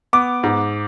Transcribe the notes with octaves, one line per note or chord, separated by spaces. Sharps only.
B3 D6
G#2